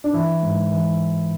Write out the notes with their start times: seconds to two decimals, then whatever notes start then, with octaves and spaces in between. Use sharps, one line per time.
0.04 D4
0.13 E3 E4
0.42 G#2
0.71 E3